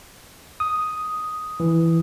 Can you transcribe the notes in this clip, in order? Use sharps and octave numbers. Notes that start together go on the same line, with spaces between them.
D#6
E3